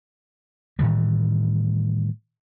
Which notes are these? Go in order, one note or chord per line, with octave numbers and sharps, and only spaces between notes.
A2 D#3 E3 G3